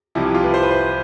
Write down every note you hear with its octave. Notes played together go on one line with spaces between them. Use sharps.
C2 C3 F3 E4
E4
F4
B4
C5
B4
C5